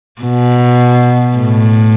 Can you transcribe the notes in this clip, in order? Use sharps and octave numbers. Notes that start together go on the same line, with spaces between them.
B2
A2